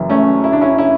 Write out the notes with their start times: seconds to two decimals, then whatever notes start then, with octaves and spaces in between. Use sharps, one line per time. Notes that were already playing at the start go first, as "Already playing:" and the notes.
Already playing: F#1 F#2 E3
0.10 A3 C#4
0.44 E4
0.53 D4
0.61 C#4 E4
0.78 C#4 E4